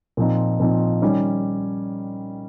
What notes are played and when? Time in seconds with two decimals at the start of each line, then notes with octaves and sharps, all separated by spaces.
0.17 A#2 F3 C4 D#4
0.60 A#2 F3 C4 D#4
1.02 D#3 G3 C#4